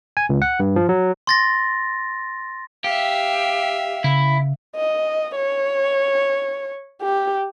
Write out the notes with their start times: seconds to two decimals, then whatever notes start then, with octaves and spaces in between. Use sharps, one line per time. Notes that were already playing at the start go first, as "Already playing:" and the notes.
0.17 G#5
0.29 C#2
0.42 F#5
0.60 G2
0.76 F3
0.89 F#3
1.27 C6 A6 A#6
2.84 G4 E5 F5
4.04 C#3 E4
4.75 D#5
5.36 C#5
7.01 G4